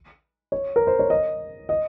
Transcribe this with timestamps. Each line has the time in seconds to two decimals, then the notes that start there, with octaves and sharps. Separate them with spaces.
0.52 C#5
0.76 A#4
0.87 C5
0.99 C#5
1.10 D#5
1.69 D#5